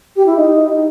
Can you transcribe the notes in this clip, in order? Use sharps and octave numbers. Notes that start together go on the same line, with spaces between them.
G4
E4
D#4